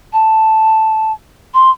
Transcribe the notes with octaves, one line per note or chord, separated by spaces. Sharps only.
A5
C6